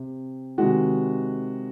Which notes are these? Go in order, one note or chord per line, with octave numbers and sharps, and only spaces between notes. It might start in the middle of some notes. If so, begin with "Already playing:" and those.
Already playing: C3
C3 D#3 G#3 F#4